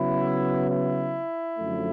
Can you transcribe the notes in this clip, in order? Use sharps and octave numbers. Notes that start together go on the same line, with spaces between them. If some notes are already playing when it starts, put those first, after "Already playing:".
Already playing: C#3 F#3 B3 E4
E4
F#2 D3 F3 A3